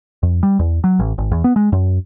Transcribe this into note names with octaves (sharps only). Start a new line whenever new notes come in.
F2
G3
E2
F#3
A1
G#1
E2
B3
G#3
F#2